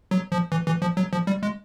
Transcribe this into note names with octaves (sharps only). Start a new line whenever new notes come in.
F#3
F3
E3
E3
F3
F#3
F3
G3
G#3